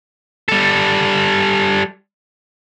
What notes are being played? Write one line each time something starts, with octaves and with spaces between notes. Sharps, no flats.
G3 A4